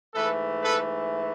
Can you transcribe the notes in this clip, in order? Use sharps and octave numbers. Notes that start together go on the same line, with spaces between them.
G#2 E3 A3 A4 B4
A4 B4